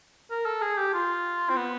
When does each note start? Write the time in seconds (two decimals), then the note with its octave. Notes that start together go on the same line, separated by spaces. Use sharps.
0.31 A#4
0.46 A4
0.62 G#4
0.78 G4
0.94 F4
1.49 C4
1.56 B3